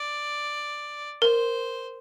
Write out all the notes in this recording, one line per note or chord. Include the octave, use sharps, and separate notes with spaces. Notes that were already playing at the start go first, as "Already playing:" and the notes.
Already playing: D5
A#4 C5